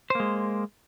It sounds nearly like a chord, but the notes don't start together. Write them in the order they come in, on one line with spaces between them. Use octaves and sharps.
C5 A#3 G#3